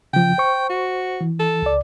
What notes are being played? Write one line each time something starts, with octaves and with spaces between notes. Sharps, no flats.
C#3 F3 G5
C5 C#6
F#4
E3
A4
C#2 D5